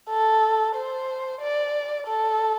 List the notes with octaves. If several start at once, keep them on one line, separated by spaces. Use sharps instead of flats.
A4
C5
D5
A4